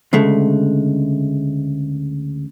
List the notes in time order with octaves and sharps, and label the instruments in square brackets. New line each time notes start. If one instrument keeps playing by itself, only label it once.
[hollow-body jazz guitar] D2 C#3 G#3 A3